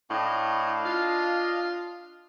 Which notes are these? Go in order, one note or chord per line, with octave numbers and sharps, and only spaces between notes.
A2 D4 D#5 F5
F4